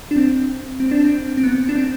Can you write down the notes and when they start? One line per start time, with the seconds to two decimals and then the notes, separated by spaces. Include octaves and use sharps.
0.11 D4
0.16 C4
0.80 C4
0.91 D4
1.04 C4
1.37 C4
1.43 B3
1.69 D4
1.76 C4